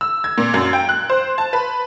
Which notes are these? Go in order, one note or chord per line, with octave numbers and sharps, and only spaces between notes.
E6
G#6
A#2
F#2
G5
F#6
C5
A5
B4